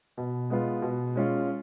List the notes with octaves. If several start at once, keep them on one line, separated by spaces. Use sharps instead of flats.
B2
G#3 B3 F4
B2
G#3 C#4 F4